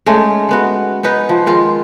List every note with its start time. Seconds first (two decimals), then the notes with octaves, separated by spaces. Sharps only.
0.06 G#3 A3 C#4 D#4
0.49 G#3 B3 F#4
1.03 B3 C#4 D#4 B4
1.29 F3
1.46 D#3 G#3 F4